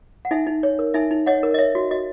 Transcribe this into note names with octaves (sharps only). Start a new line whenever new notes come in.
F#5
D#4 E5 G#5
D#4
C#5
A#4
D#4 E5 G#5
D#4
C#5 D#5 F#5
A#4
D#5
C#5 E5
F#4
F#4 D#5